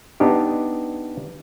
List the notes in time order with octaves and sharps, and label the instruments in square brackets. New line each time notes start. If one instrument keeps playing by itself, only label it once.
[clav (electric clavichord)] B3 D4 D#4 G4